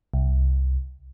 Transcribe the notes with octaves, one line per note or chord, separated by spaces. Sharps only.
C2